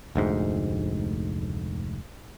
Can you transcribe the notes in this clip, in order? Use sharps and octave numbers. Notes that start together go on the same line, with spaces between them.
F1 D2 G#2